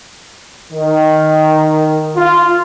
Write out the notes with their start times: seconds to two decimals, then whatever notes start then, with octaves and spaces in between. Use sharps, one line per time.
0.72 D#3
2.16 F4